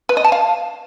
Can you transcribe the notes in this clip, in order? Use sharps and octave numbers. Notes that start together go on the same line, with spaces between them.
B4
D#5
A5
F5